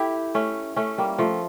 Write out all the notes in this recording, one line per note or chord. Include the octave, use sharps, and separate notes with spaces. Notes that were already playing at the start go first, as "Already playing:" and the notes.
Already playing: E4 G4 A4
A3 C#4
A3 C#4
G3 A#3
F3 A3